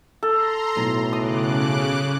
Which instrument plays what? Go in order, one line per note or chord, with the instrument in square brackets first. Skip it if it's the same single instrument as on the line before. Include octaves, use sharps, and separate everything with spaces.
[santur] A4 [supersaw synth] A#5 C6
[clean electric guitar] B1 [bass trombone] A2
[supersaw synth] C#3 D6 F#6 [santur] D#6